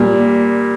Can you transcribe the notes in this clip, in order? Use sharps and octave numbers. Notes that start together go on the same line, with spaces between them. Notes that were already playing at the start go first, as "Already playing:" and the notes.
Already playing: A#2 G3 A#3